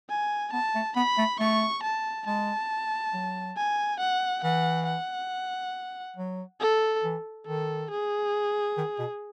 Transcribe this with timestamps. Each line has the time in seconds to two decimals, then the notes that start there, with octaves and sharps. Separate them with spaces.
0.10 G#5
0.53 B3 A5
0.75 A3
0.96 B3 B5
1.18 A3
1.40 A3 C#6
1.84 A5
2.26 G#3 A5
3.14 F#3
3.57 G#5
4.00 F#5
4.43 E3 F#5
4.86 F#5
6.16 F#3
6.60 A4
7.04 E3
7.47 D#3 A4
7.91 G#4
8.77 D#3
8.99 B2